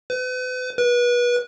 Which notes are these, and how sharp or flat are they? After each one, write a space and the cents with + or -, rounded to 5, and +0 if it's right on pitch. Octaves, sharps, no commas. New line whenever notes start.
B4 +40
B4 -30